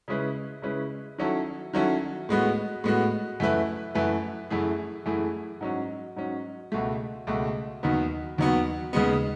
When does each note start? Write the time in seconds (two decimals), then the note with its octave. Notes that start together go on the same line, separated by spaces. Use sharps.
0.08 C#3 G#3 C#4 E4 B4
0.62 C#3 G#3 C#4 E4 B4
1.18 D#3 F#3 C#4 E4 A4
1.73 D#3 F#3 C#4 E4 A4
2.29 A2 G#3 B3 F#4
2.84 A2 G#3 B3 F#4
3.40 F#2 E3 A3 E4 B4
3.95 F#2 E3 A3 E4 B4
4.50 F#2 E3 A3 E4 G#4
5.06 F#2 E3 A3 E4 G#4
5.61 G#2 F#3 C#4
6.16 G#2 F#3 C#4
6.72 C#2 B2 A3
7.27 C#2 B2 A3
7.83 D#2 D#3 F#3 B3
8.38 D#2 D#3 F#3 B3
8.93 D#2 C#3 G#3 B3